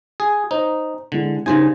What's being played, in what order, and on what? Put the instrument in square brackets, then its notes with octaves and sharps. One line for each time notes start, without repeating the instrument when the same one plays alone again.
[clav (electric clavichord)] G#4
[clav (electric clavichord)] D#4 [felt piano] C5
[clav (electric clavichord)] D3 [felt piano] G#3 E4
[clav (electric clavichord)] C#3 C5 G#5 [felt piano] D4 G4 [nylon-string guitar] D#4 A#4